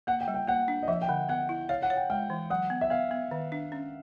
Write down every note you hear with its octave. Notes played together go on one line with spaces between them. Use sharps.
A#3 F#5
G5
G3
G5
A#3 F#5
D4
D#5
F3 E5
G5
D3 F#5
B3 F#5
E4
C#5 F5
F#5
C#5
G5
G#3 G5
E3
F#3 F#5
B3
E5
B3 F5
B3
D#3
D4
C#4